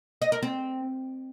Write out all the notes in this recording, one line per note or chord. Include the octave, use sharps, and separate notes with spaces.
D#5
A#4
C4